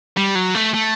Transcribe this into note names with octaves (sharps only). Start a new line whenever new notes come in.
G3
F#3
A3
A3